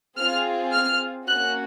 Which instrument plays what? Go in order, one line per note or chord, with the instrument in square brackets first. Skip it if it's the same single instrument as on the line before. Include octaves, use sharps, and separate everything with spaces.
[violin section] C4 F4 G#4 F6
F6
A#3 C#4 F#4 F#6